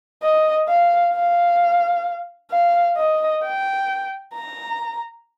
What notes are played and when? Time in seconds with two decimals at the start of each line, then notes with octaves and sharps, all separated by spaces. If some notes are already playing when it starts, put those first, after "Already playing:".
0.23 D#5
0.69 F5
1.14 F5
2.51 F5
2.97 D#5
3.43 G5
4.34 A#5